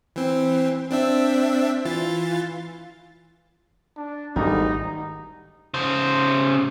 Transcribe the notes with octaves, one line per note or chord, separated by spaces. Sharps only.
E3 C4
C4 D4 E5
E3 F4 A6
D4
G#1 G#2 G3 A3 D#4
C#3 C5